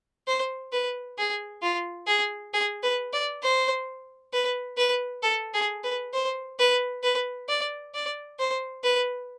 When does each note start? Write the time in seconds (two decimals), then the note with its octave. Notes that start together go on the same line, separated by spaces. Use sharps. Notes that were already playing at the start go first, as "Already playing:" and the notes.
0.27 C5
0.72 B4
1.18 G#4
1.62 F4
2.07 G#4
2.53 G#4
2.83 B4
3.13 D5
3.43 C5
4.33 B4
4.77 B4
5.23 A4
5.54 G#4
5.84 B4
6.13 C5
6.59 B4
7.03 B4
7.49 D5
7.94 D5
8.39 C5
8.84 B4